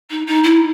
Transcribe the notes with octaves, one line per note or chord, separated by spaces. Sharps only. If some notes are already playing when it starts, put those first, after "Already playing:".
D#4
D#4
E4